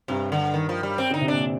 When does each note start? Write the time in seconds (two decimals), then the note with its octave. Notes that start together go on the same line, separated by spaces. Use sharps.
0.08 G2 C3
0.32 D3
0.54 D#3
0.69 F3
0.83 G3
0.98 C4
1.10 D3
1.14 D#4
1.21 C3
1.28 A#2 D4